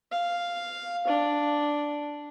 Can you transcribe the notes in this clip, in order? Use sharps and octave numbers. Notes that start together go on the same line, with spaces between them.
F5
D4